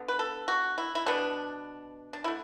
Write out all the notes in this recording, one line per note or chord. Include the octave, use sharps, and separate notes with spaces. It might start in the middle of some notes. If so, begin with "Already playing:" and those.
Already playing: D3 B3
B4
A4
F#4
E4
E4
B2 B3 D4
D4
D3 A3 E4